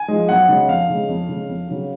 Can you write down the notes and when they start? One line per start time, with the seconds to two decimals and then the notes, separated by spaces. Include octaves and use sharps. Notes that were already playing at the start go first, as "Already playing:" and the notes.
Already playing: G#5
0.08 F3 G#3
0.29 F#2 F#5
0.49 C#3 G#3
0.68 F2 F5
0.89 C#3 G#3
1.09 F2
1.28 C#3 G#3
1.49 F2
1.68 C#3 F#3